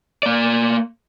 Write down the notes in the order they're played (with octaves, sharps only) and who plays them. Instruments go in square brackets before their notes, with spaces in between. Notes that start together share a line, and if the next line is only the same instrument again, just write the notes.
[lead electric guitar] A#3 D5